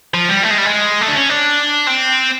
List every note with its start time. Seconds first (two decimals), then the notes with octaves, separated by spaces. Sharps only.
0.14 F3
0.29 G3
0.43 A3
0.50 G#3
0.58 G3
0.65 G#3
1.01 A3
1.08 D4
1.15 C#4
1.29 D4
1.87 C4